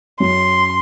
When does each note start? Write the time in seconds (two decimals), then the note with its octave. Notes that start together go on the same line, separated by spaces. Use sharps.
0.20 F#2 C6